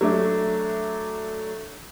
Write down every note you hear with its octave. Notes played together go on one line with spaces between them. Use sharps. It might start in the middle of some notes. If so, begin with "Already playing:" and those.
F#3 A3 D4 E5